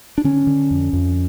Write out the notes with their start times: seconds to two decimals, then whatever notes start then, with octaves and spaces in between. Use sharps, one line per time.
0.18 D4
0.24 D3 C#4
0.47 D3
0.71 F2
0.93 F2